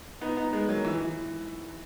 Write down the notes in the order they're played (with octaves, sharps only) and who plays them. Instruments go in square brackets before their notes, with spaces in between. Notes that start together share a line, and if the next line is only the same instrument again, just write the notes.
[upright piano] B3 D#4
B3 D#4
G#3 B3
F#3 A#3
E3
E3